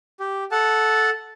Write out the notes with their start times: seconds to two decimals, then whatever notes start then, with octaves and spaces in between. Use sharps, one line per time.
0.20 G4
0.52 A4 F#5 A5